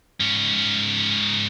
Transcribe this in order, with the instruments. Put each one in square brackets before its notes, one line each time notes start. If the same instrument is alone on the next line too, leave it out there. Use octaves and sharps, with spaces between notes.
[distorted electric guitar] G#2 C#4